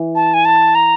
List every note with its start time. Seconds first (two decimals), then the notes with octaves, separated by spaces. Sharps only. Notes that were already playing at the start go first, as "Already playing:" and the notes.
Already playing: E3
0.15 A5
0.34 G#5
0.45 A5
0.75 A#5